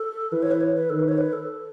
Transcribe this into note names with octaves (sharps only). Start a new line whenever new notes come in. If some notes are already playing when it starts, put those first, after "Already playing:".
Already playing: A4
E3 B4
C#5
B4
C#5
B4
D#3 A4
B4
C#5
B4
A4